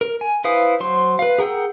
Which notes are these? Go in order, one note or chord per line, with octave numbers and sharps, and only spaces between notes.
A#4
G#5
E4 B4 C5 F5 D#6
F#3 C5 C6
B4 F5
G#4 A#4 F#5 G5 E6